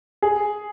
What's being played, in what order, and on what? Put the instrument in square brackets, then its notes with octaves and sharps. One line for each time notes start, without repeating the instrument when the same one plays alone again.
[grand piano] G#4